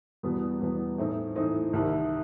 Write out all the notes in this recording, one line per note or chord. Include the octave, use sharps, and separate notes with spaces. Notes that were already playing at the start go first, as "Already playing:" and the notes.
E2 B2 G3 B3
E2 B2 G3 B3
A2 E3 A3 C4 D#4
A2 E3 A3 C4 D#4
C2 C3 D#3